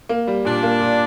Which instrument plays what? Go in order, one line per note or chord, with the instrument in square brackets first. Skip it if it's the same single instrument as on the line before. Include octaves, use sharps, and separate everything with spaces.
[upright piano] A#3
G3
[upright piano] A#2 [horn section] D4
[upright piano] A#3
A#2